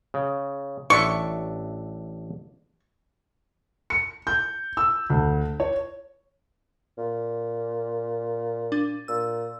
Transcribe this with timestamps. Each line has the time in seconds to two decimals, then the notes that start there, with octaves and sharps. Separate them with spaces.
0.14 C#3
0.90 A1 D4 E5 C#6
3.90 C#7
4.27 G6
4.77 E6
5.10 D2
5.60 C#5
6.98 A#2
8.72 D4
9.08 A#2 E6